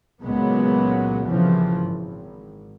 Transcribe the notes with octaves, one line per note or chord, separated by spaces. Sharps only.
C#2 A#2 C#3 F#3 G#3 B3
C2 A#2 C#3 E3 F3
G#1